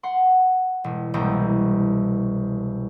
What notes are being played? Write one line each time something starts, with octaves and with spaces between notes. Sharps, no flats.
F#5 C6
E1
E1 C2 A#3 A#5 G6